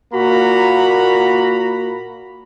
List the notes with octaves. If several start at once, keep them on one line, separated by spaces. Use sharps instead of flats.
A#2 A#3 F#4 A#5 B5